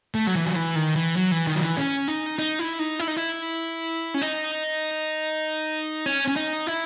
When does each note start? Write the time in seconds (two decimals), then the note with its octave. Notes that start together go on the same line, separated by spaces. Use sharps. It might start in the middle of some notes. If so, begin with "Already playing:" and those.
0.15 A3
0.27 F#3
0.35 E3
0.45 F#3
0.56 E3
0.76 D#3
0.96 E3
1.16 F#3
1.31 E3
1.47 D#3
1.55 F#3
1.62 E3
1.77 C#4
2.08 D#4
2.39 D#4
2.59 E4
2.79 D#4
2.99 E4
3.08 D#4
3.16 E4
4.14 C#4
4.22 D#4
6.06 C#4
6.28 C#4
6.36 D#4
6.67 E4